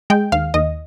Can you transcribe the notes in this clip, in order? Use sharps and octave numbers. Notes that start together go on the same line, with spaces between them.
G#3 G5
D#2 F5
D#2 D#5